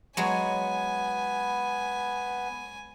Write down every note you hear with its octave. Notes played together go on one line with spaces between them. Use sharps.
F#3 G#3 B3 G#4 G#5